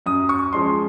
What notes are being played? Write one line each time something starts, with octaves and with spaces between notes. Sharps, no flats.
F#2 D#6
C#6
F3 G#3 C#4 C6